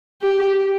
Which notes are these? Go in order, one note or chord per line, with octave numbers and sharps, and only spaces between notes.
G4